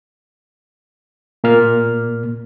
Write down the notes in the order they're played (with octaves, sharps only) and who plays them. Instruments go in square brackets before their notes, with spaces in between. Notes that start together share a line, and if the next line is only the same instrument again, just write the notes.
[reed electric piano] A#2 A#3 F6